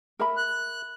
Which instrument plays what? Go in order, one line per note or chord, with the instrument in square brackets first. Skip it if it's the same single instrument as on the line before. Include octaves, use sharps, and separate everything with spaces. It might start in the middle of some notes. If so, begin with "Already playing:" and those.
[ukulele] A#4 E5 B5
[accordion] F#6